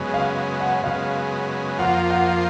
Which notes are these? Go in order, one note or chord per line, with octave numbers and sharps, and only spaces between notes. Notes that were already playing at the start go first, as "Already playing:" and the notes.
Already playing: F#2 C#3 G#3 B3
F5
F#5
F#2 C#3 G#3 B3 F5
F2 F3 A#3 F4 F#5
F#5